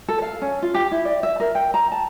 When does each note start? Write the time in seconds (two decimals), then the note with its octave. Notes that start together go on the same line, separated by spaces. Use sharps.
0.08 A4
0.22 F5
0.42 C#4
0.62 F4
0.74 G4
0.91 E4
1.05 D5
1.23 E5
1.40 A#4
1.55 G5
1.74 A#5
1.92 A5